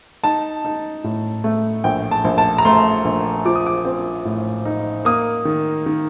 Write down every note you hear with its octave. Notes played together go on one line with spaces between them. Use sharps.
D#4 A5
D#4
A2
A3
A#1 G5
A5
A#1
A5
A#5
A3 C6
A#1
F3 D6
D#6
D6
C4
A2
D#4
A#3 D#6
D#3
D#3